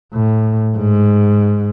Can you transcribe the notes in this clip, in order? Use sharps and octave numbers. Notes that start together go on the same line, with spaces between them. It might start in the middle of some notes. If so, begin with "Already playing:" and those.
A2
G#2